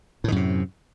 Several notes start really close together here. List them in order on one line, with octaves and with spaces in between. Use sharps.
A2 D#3 F#2 C3